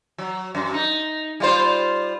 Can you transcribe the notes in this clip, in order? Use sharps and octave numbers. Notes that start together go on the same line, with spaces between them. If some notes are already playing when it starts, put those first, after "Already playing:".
F#3
F#2
D#4
G3 F4 C5